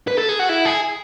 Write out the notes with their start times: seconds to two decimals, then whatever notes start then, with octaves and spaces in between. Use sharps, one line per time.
0.07 B4
0.18 A4
0.29 G#4
0.40 F#4
0.50 E4
0.66 G#4